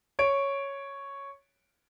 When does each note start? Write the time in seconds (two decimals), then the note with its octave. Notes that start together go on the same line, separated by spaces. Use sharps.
0.19 C#5 D7